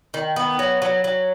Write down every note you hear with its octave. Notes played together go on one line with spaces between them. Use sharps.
D#3
B3
F#3
F#3
F#3